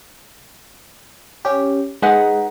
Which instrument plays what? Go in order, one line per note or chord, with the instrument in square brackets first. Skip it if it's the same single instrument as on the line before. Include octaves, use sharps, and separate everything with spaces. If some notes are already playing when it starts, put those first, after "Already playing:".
[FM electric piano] C#4 G4
[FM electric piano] G#3 [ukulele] D#4 B4 F#5